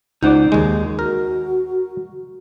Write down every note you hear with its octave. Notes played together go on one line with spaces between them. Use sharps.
C#2 D#4 C5 D5 F#5
D#2 G#3
F#4 A#4